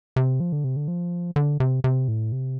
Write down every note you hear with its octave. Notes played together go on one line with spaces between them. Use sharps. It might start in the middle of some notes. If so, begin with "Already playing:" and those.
C3
F3
D3
C3
D3
F3
D3
C3
C3
A2
C3